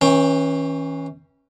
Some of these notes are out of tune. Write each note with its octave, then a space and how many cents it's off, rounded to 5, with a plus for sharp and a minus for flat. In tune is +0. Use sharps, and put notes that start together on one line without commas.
E3 -35 C#4 -15 G5 +0